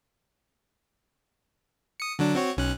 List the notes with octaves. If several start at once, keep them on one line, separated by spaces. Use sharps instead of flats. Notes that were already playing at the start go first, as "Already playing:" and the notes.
D#6 C#7
D3 F#3 D4
C4 F#4 C#5
B1 C#4 F#6